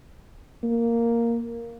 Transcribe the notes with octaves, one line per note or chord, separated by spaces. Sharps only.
A#3